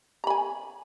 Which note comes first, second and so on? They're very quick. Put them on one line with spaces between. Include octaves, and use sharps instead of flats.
A#5 B5 G#5